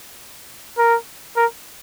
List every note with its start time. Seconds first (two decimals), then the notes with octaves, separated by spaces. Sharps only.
0.78 A#4
1.37 A#4